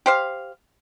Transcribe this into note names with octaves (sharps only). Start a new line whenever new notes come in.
G4 C5 F5